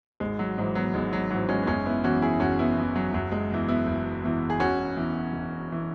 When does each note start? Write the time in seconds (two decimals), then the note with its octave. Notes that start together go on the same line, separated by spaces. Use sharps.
0.20 G#1 G#3
0.39 F#3
0.58 G#2 E3 G#3
0.75 F#3 B3
0.94 G#1 G#3
1.13 F#3
1.30 G#2 E3 F#3
1.49 G#3 C#4
1.63 B3
1.67 F#1 G#3 C#4
1.86 B3 E4
2.04 E2 E3 C#4 F#4
2.22 E4 G#4
2.40 F#1 C#4 F#4
2.59 B3 E4
2.77 E2 E3
2.96 F#3
3.13 F#1 F#3
3.32 G#3
3.51 E2 E3
3.68 B3 E4
3.87 F#1
4.24 E2 E3
4.50 G#4
4.60 E1 C#4 F#4
4.97 E2 E3
5.33 E1
5.72 E3